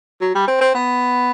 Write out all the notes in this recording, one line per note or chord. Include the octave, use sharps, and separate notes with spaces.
F#3
G3
C4
C4
B3